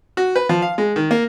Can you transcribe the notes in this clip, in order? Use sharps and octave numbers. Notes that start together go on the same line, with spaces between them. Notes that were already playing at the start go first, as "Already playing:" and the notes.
F#4
B4
F3
F5
G#3
D#3
A#3